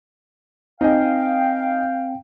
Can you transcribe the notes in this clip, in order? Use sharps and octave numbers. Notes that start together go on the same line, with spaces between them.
C4 D#4 D#5 F5 G5 G#5